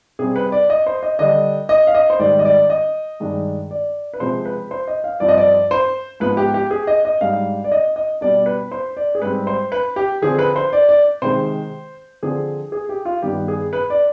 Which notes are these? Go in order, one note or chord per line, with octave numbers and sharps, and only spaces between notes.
C3 G3 C4 G#4
B4
D5
D#5
C5
D#5
D3 G3 D4 D#5
D#5
F5
D#5
C5
G#2 D#3 G3 D5
D#5
D5
D#5
G2 D#3 G#3 D4
D5
B4
C3 F3 G#3 C5
B4
C5
D#5
F5
G2 F3 C4 D5
D#5
D5
C5
G#2 F3 B3 B4
G4
G4
G#4
D#5
D#5
G#2 G3 D4 F5
D5
D#5
D#5
B2 G3 D4 D5
B4
C5
D5
G#4
G#2 G3 C4 B4
C5
B4
G4
D3 F3 C4 G#4
B4
C5
D5
D5
C3 D#3 G#3 C5
D3 F3 C4 G#4
G#4
G4
F4
G2 D#3 B3 G4
G#4
B4
D5